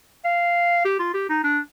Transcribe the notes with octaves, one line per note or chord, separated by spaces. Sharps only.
F5
G4
F4
G4
D#4
D4